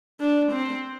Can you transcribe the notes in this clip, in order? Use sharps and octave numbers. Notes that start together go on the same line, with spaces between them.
D4
C4